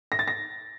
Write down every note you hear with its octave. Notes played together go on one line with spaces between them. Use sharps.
A#6
A6
A#6